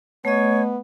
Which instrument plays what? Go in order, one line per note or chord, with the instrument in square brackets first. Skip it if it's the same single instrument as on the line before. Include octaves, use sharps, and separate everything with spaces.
[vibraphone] A3 D#5 [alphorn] B3 [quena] C#5